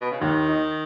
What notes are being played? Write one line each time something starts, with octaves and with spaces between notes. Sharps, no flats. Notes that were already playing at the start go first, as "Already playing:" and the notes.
B2
C#3
D#2 D#3
D#4